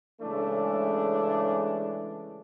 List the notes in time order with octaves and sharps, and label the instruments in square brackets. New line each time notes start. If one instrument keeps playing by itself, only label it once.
[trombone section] C#3 E3 G#3 A3 C#4 D4